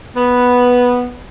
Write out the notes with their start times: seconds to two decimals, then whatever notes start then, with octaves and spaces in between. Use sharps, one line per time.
0.16 B3